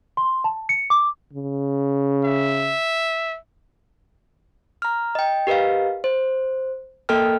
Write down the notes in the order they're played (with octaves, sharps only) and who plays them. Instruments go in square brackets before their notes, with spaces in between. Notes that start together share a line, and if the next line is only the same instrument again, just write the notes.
[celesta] C6
A5
C#7
D6
[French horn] C#3
[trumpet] E5
[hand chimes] A#5 F6
D#5 G5
G4 A#4 B4 D#5 F5
C5
A#3 A4 A#4 D#5 G5 F6